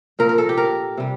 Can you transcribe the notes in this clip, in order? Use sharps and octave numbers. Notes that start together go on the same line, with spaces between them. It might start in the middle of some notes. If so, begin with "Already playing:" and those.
A#2 F3 A#4
A#4
A4
G4
A#4
C3 G3